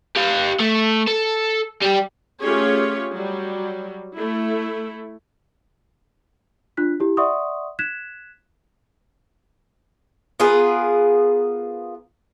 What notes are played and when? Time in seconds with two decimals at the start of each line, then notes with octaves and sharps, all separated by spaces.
0.16 G4 F5
0.60 A3
1.08 A4
1.82 G3 G4
2.40 A3 C#4 F4 G4 G#4 C#5
3.12 F#3 G3
4.15 A3 E4
6.77 D4 F4 F#6 B6
7.00 E4 G4
7.17 D5 E5 F#5 C6 C#6 D#6
7.79 F#6 G#6 B6 E7
10.40 B3 F4 G#4 A#4